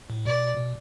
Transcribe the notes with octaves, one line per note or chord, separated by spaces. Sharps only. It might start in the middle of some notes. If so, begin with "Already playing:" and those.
A2
B2 D5
B2